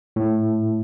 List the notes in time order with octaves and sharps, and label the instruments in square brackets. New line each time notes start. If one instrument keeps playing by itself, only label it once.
[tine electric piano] A2